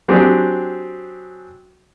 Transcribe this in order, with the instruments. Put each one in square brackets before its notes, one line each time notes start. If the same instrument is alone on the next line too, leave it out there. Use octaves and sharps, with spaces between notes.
[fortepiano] F#3 C4 D4 G4 G#4